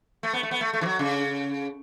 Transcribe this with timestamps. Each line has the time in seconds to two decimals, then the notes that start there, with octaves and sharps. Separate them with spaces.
0.23 A3
0.33 B3
0.43 A3
0.51 B3
0.61 A3
0.74 A3
0.81 E3
0.86 F#3
0.99 C#3